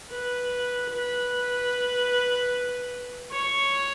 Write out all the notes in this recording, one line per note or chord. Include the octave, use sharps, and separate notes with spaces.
B4
B4
C#5